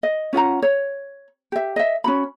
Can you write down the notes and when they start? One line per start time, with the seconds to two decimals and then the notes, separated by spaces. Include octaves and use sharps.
0.03 D#5
0.33 C#4 F4 F#5 A#5
0.62 C#5
1.52 G4 E5
1.76 D#5 E5
2.04 C#4 F#4 B5